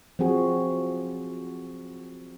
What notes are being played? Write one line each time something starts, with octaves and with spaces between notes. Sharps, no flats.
F3 F#3 C4 F#4 G#4